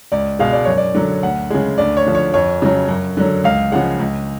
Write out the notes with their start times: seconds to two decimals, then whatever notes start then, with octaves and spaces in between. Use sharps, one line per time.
0.12 C#2 D5
0.39 B2 G#3 F5
0.53 D5
0.65 F#2 C#5
0.77 D5
0.95 D3 F#3
1.23 D2 F#5
1.50 C#3 G#3
1.78 D2 D5
1.97 C#5
2.06 D3 F3
2.15 C#5
2.34 F2 C#5
2.62 C#3 F#3
2.88 F#2
3.17 D3 F#3
3.44 C#2 F5
3.72 C#3 F3 G#3 F#5
3.99 C#2